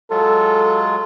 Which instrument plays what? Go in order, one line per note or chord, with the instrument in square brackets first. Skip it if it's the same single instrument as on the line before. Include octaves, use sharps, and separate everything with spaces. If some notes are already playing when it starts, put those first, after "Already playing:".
[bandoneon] F#3 G#3 F4 [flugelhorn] A4